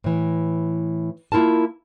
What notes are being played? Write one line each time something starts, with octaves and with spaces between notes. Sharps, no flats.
A2 E3
A#3 E4 F4 A#4 A5